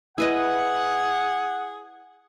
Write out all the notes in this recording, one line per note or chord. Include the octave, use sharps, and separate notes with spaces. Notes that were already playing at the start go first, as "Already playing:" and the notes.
E4 G#4 B4 D#5 F#5